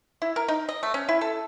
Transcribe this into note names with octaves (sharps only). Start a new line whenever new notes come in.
E4
A#4
D#4
D#5
A3
C#4
E4
A4